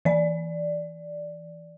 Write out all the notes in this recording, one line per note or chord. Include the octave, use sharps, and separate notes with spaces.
E3 D5